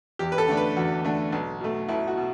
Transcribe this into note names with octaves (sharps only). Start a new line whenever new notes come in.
E2 G4
B4
A4
D3 A3 D4
B4
E2 F#4
D3 A3 D4
B1
B2 A3
B1 E4
F#4
B2